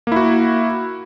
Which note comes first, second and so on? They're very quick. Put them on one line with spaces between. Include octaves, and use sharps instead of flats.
A#3 E4 F#4